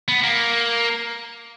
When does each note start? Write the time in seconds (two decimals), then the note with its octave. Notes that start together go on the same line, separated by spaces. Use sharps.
0.08 B3
0.23 A#3